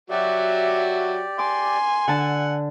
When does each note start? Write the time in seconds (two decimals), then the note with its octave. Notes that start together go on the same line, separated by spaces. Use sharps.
0.10 F#3 F#4 G4 D5 E5
1.39 G#5 C6 D6
2.08 D3 F#5 A5